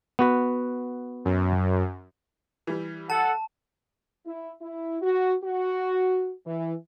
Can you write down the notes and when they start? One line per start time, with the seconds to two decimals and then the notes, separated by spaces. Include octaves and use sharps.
0.19 B3 F#4 B4
1.25 F#2
2.67 E3 G3
3.10 A4 F#5 A5
4.26 E4
4.61 E4
5.02 F#4
5.44 F#4
6.46 E3